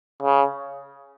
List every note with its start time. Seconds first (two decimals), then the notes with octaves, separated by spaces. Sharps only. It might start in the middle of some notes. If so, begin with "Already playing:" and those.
0.23 C#3